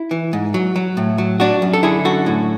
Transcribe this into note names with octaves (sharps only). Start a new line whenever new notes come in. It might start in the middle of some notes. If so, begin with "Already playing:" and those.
Already playing: E4
E3
G#2
F#3
F#3
A2
F#3
F#3 D4 F#4
F#2
A4
D3 E4 G#4
F#2 F#4 A4
A2